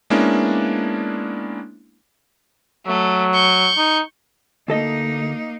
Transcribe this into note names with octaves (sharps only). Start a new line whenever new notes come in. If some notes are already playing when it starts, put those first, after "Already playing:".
G#3 A#3 B3 C#4 D4 E4
F#3 A3
C#6 G6
D#4
D2 A#3 D#4 A4 D#5